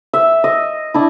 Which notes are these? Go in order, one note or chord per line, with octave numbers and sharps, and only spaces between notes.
E5
D#5
D4 E4